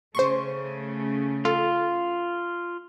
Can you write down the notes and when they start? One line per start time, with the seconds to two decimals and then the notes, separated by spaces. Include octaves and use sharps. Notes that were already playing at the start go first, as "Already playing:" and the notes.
0.15 C#3 A3 C5 C6 C#6
1.45 F4 A4